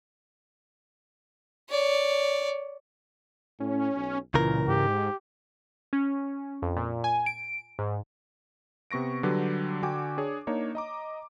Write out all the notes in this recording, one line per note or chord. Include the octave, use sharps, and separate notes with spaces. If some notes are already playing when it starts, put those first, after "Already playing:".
C#5 D5
A2 C#4
B1
C#2 A#2 C#3 E3 A#4
G#2 G4
C#4
F2
A#2
G#5
D7
G#2
C3 B3 C#6 A#6 D7
D3 F#3 G3 G4 B4 D5
D3 F#4 G5 G#5 D6
D4 G#4 C#5
A#3 D4 D#4 C#5
D#5 A#5 D6